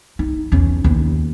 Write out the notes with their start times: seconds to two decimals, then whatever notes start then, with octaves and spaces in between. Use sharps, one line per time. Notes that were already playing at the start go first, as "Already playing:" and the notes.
0.19 D#4
0.52 E2 C#4
0.84 D#2 B3